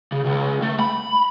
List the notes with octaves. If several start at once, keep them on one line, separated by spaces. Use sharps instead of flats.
C#3
C#2
A3
B5